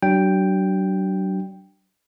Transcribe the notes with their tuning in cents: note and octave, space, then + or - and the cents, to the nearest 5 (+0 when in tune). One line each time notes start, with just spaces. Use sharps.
F#3 +40 D4 +0 G5 +0